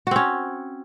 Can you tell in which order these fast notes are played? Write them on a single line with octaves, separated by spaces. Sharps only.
F#4 C4 C#4